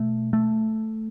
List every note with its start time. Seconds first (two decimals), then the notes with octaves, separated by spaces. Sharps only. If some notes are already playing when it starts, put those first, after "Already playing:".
Already playing: B2 A3
0.33 A3